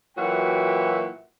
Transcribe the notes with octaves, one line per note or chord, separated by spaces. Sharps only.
A#2 E3 F#3 F#4 E5 G5